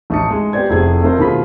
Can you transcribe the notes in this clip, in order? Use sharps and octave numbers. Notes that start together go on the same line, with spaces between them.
A1 D#4 A5 D#6 C#7
G#3
B3 G4 C5 D5 G#6
F1 E4 G#4 G#6
A3 C4 D#4 F4 A#4 C5
B2 D#3 F4 G#4 B5 B6